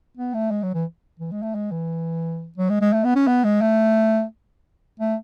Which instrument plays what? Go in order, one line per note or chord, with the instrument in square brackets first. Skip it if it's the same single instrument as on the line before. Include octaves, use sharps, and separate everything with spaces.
[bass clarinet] B3
A3
G#3
F#3
E3
E3
G#3
A3
G#3
E3
F#3
G#3
G#3
A3
B3
C#4
B3
G#3
A3
A3